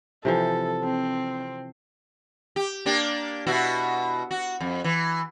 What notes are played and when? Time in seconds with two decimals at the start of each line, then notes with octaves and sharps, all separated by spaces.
0.25 C3 E3 F3 A4
0.84 C4
2.56 G4
2.86 A#3 D4 G4
3.47 B2 E4 F#4
4.31 F#4
4.60 F2
4.84 E3